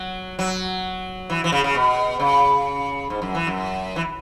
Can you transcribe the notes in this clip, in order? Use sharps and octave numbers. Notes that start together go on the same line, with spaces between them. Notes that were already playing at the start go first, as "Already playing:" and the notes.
Already playing: F#3
F#3
E3
E3
C#3
C#3
B2
C#3
G#2
F#2
E3
F#2
E3